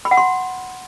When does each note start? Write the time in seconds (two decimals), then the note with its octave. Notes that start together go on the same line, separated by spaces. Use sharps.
0.05 B5
0.11 F#5
0.17 C6